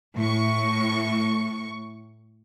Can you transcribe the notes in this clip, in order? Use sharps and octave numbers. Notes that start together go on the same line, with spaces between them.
A2 C#6